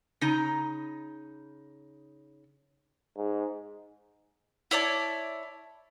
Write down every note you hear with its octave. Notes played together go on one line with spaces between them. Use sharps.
C#3 D#4 A#5
G#2
E4 C#5 D5 A5